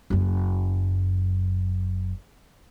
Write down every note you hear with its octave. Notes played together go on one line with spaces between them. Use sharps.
F#1 F#2